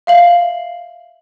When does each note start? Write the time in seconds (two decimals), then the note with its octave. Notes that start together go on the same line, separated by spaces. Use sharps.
0.07 E5 F5 F#7